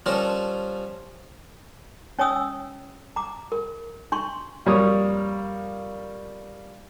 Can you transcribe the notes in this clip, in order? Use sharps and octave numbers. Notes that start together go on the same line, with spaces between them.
F3 G3 C#4 D4 A4 A#4
C#4 C#5 G#5 D#6 E6
A#5 D6
A#4
D4 C6 C#6
F2 G3 A#3 C#5 D#6